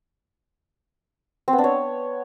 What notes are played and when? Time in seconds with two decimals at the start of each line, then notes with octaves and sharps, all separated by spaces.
1.48 C4
1.53 B3
1.58 D4
1.64 C#5